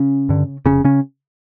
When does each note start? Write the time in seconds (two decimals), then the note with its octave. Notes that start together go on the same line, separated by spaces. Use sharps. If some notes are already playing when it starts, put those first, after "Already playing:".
Already playing: C#3 C#4
0.29 G2 D3
0.66 F1 C#3 C#4
0.84 C#3 C#4